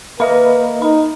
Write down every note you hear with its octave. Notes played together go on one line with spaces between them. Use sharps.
A#3 A#4 B4 D#5 E5 B5
D#4 B5